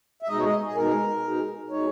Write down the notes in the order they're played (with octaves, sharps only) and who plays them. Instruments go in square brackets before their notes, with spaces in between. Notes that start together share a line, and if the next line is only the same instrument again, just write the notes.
[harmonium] E5
B2 G#3 D#4 D#5
C#5
D#5
G#4
B2 G#3 D#4 A#4
B2 G#3 D#4
B2 G#3 D#4 C#5